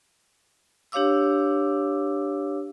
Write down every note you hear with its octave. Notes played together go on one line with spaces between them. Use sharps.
D4 G4 C#5 F5 D6 E6